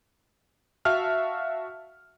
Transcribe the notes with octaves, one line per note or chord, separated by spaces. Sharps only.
F#4 E5 F5 A5 F6